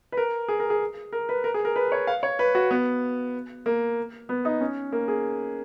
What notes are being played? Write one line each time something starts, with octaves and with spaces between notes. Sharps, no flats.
B4
A#4
G#4
A#4
G#4
A#4
B4
A#4
G#4
A#4
B4
C#5
F5
C#5
B4
F#4
B3
A#3
B3
D#4
C#4
A#3
G#4